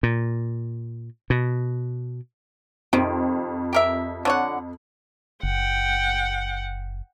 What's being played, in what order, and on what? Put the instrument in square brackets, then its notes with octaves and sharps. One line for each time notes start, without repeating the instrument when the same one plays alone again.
[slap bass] A#2
B2
[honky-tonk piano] F2 [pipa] C3 D#3
[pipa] G4 A#4 E5
D3 C#5 F#5
[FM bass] F#1 [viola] F#5 G5